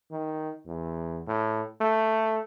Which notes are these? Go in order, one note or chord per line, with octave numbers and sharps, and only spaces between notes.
D#3
E2
A2
A3